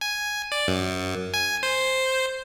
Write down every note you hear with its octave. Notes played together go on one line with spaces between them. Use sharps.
G#5
D5
F#2
G#5
C5